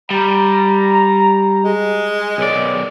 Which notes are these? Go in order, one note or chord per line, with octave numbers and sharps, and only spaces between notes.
G3 A#5
G#3
B1 G#4 A#4 C#5 D5